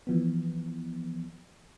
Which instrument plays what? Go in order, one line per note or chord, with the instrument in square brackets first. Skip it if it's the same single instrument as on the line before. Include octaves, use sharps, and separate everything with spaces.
[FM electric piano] E3 F3 B3